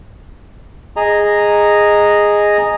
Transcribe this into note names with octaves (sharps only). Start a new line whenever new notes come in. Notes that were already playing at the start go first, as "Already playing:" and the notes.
G#4 D#5 A#5